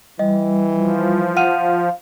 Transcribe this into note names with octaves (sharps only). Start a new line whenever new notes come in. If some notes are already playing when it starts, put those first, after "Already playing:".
E3 G3 D#5
F3
F5 F#5 F6 D#7